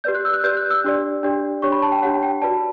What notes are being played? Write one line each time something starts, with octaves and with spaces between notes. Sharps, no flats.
G4 B4 D5 G6
F#6
E6
F#6
G4 B4 D5 G6
F#6
E6
D4 G4 D5
D4 G4 D5
D4 G4 C#5 C#6
B5
A5
G5
D4 G4 C#5 F#5
G5
F#4 B4 D5 A5